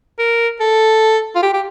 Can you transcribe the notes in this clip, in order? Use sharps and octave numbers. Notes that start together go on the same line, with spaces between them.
A#4
A4
F4
G4
G4